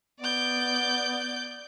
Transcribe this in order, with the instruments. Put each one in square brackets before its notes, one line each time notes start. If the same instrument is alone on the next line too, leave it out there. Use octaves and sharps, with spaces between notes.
[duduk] B3 [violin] D5 G6